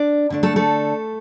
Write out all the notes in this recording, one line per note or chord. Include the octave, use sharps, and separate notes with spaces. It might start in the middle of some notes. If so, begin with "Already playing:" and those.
Already playing: D4 D5
D3 A3 D4
A3 A4
A3 A4